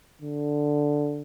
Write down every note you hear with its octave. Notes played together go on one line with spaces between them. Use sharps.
D3